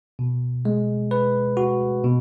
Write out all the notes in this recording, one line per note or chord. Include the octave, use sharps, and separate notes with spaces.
B2
G#3
B4
F#4
B2